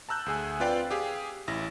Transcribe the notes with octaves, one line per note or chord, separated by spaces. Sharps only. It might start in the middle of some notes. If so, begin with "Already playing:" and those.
A5 A#5 E6 F#6 G6
D2 G#4 G#5
C4 F4 B4 D5 F5 G5
G4 G#4 F5
A1 E4 A#6